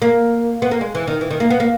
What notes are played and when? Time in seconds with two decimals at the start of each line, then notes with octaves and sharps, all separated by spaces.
0.02 A#3
0.62 B3
0.71 A#3
0.81 G#3
0.95 E3
1.07 D#3
1.21 E3
1.31 D#3
1.40 A#3
1.50 B3
1.60 A#3